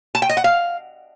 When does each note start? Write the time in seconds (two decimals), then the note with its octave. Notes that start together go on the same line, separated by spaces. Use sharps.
0.15 A5
0.22 G5
0.29 D#5
0.37 F#5
0.44 F5